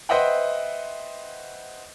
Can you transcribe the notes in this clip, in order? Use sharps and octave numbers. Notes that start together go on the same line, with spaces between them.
B4 C5 D#5 E5 F#5 G5